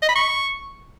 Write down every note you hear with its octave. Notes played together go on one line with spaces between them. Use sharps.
D#5
B5
C#6